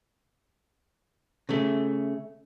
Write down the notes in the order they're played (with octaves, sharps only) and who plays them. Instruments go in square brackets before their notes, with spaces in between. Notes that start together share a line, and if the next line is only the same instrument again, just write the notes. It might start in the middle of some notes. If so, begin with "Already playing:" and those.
[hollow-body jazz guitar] C#3 A3